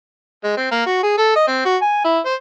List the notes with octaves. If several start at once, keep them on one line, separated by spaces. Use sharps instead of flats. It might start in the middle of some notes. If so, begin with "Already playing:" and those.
G#3
C4
A#3
F#4
G#4
A4
D#5
C4
F#4
G#5
E4
C5